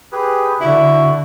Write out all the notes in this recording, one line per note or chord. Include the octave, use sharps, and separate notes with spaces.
G4 G#4 B4
D3 E4 F#4